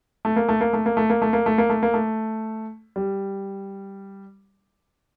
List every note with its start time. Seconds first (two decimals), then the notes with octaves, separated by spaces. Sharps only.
0.25 A3
0.36 A#3
0.49 A3
0.61 A#3
0.73 A3
0.86 A#3
0.97 A3
1.10 A#3
1.22 A3
1.33 A#3
1.46 A3
1.58 A#3
1.70 A3
1.83 A#3
1.94 A3
2.96 G3